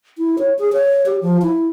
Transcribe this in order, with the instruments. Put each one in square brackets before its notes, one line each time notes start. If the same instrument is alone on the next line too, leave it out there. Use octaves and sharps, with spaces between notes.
[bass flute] E4
C#5
G#4
C#5
G4
F3
E4